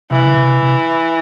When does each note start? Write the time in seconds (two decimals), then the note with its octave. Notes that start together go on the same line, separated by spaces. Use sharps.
0.11 C3 E3
0.22 C#3
0.34 C3
0.62 C3